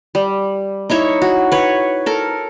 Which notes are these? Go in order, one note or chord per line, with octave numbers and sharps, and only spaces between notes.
G3
D#4 E4 C#5 E5
F#4
B4 C#5
A4 A#4